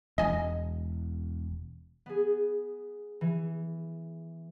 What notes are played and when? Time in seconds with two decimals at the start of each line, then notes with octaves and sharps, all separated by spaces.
0.18 E1 D#5 G#5
2.06 B3 G#4
3.21 E3